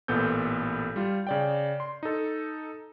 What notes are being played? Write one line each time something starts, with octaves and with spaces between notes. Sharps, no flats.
A1 A#2 B3 A4 G6
G3 F4
C#3 D5 G5
C6
D#4 A4